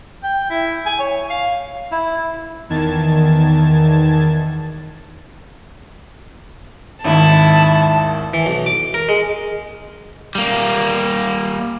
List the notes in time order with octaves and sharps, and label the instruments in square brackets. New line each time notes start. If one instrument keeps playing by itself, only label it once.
[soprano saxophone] G5
E4
G#5
C#5
F5
[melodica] E4
[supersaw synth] E2 D#3 A5 G#6
[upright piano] G#1 D#2 G#2 [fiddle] E4 [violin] A5
[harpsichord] E3
B1
D6
A#4
G#3
[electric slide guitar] G3 A#3